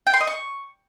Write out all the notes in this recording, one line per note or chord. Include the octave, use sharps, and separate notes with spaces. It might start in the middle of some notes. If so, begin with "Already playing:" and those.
G5
C6
D#5
C#6